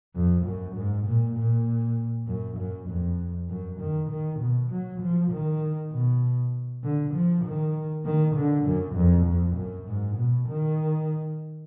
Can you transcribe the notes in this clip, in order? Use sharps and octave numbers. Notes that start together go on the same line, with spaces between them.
F2
F#2
G#2
A#2
A#2
F#2
F#2
F2
F#2
D#3
D#3
B2
F#3
F3
D#3
B2
D3
F3
D#3
D#3
D3
F#2
F2
F2
F#2
G#2
B2
D#3